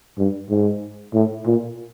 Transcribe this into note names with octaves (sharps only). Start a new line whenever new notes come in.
G2
G#2
A2
A#2